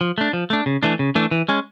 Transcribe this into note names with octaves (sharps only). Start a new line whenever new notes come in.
F3
A3 D4
F3
A3 D4
C#3
E3 A3 D4
C#3
E3 A3 D4
E3
G#3 C#4